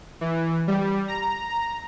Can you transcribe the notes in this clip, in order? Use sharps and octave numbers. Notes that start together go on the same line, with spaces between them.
E3
G3
A#5
A#5